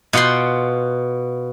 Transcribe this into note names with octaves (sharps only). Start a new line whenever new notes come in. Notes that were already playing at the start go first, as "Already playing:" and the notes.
B2 F4 F#5 G5 C6